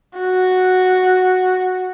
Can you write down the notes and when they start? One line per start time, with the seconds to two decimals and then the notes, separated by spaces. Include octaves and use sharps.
0.18 F#4